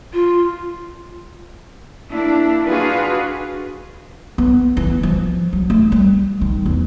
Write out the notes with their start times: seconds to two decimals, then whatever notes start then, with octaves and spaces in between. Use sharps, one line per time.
0.13 F4
2.11 A#3 D4 E4
2.67 D4 F4 F#4 G#4 B4
4.38 B3
4.77 E3
5.03 F3
5.53 F#3
5.70 A3
5.92 G3
6.41 D#3
6.66 E2